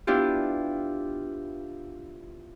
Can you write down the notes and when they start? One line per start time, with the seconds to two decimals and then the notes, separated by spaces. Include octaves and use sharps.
0.07 B3 D4 E4 F4 G4